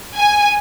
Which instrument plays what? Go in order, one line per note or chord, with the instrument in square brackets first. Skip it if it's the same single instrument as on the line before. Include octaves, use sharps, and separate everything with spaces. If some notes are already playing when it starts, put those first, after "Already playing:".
[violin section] G#5